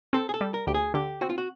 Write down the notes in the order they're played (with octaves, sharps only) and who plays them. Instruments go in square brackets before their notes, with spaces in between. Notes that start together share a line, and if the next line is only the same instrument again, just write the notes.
[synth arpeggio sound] C4 [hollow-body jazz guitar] A4
[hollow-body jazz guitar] G#4
A4
[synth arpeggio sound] G3
[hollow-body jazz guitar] A#4
[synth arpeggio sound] D2 [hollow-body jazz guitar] G4
[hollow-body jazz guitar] G#4
[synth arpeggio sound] D3 [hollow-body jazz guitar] G4
[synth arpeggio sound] C4 [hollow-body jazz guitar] F#4
[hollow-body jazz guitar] F4
F#4